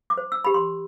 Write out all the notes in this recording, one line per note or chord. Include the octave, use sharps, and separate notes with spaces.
D6
C5
E6
G4 B5
C6